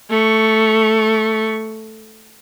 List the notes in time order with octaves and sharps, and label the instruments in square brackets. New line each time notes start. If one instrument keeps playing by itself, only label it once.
[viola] A3 C#6